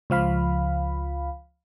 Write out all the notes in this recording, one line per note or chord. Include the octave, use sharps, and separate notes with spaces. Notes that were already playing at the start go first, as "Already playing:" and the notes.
C#2 F3 F5 B5